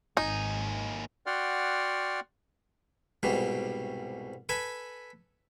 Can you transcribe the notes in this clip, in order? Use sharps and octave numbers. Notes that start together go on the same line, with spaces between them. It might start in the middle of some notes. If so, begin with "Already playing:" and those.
G#1 D#2 D#4 G#5
F#4 D5 F#5 G5 C6 F6
C2 G#2 B2 G3
A4 B4 G#5 A5